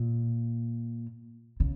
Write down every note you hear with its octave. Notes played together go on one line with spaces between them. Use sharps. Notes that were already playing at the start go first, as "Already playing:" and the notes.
Already playing: A#2
C#3